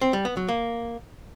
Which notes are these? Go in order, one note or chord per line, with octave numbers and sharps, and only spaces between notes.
C4
G3
B3
F#3
A#3